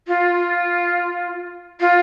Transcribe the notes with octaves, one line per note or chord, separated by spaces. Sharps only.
F4
F4